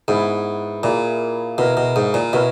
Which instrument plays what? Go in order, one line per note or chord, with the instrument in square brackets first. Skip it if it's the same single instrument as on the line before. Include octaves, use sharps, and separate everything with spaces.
[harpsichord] G#2 [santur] B3 E4 B4
[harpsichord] A#2 [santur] A#3 E4 G#4
[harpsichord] B2 [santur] E4 A#4 E5
[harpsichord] B2
G#2
A#2
[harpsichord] B2 [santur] E4 A#4 C#5 E5